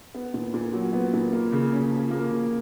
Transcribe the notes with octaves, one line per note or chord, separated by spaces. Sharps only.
B3
A#2
A#2
F#3
B3
A#2
A#3
C#3
C#4
F3
A#3
C#3